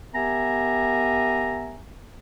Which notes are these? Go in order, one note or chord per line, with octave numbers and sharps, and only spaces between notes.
B3 G4 A#4 E5 G#5 A#5